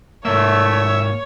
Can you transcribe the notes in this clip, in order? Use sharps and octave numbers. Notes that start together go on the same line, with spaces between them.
G#2 A3 A#3 C#5 E5